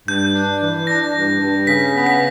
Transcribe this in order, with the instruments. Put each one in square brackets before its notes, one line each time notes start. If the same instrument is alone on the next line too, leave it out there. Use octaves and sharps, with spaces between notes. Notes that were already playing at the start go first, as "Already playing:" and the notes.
[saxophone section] G2 [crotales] G6
[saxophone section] D4
E3
[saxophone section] D4 [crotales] A#6
[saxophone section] G2
G2
[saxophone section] C#3 [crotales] B6
[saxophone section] B3
[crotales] B6